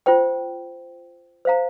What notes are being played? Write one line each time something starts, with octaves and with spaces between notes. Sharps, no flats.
F4 C5 G5
C5 F5 A#5